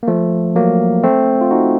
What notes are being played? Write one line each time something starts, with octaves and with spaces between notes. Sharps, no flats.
A#3
F3 A3
F#3 A#3
A3 C4
F4
D#4 F#4